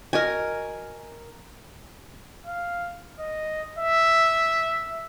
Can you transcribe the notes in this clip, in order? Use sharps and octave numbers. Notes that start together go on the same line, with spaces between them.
F#4 A#4 D#5 G#5
F5
D#5
E5